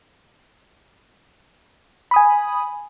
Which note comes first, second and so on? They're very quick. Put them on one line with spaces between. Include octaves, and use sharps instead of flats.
B5 D#6 G#5